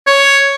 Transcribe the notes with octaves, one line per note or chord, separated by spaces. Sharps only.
C#5